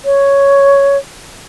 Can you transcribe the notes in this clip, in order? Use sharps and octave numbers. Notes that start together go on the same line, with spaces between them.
C#5